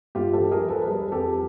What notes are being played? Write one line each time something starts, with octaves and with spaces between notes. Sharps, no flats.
G2 F4 G4
G4 A4
F3
G#4 A#4
F3
A4 B4
B4
G3 G#4 A#4
F2 G4 A4